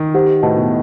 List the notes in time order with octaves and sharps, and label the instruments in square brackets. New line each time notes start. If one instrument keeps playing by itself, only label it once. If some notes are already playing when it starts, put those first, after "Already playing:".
Already playing: [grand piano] D#3
[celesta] G4 C5 F#5
[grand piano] A2 [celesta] F#4 B4 D#5 F#5 A5
[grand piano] B2